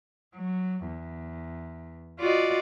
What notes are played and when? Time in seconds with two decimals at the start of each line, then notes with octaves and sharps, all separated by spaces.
0.36 F#3
0.86 E2
2.20 F4 F#4 D5 D#5